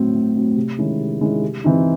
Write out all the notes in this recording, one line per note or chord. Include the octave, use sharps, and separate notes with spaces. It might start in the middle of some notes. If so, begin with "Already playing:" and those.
Already playing: A2 F#3 C4
A2
F#3 C4
C3
D#3 G#3 C#4 E4
C3
D#3 G#3 C#4 E4
C3
E3 C4 D#4